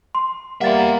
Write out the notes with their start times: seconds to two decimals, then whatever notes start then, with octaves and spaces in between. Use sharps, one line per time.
0.15 C6
0.61 G3 A#3 B3 E5 F#5 A6